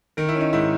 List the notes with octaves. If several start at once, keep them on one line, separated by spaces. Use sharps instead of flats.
D#3 A#4
E4
C#4
D#4
G#2 E4